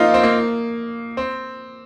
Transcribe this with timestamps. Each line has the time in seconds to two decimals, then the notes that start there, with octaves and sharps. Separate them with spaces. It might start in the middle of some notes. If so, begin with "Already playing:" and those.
Already playing: A#3 C4 D#4 F4
0.14 C4
0.24 A#3
1.17 C4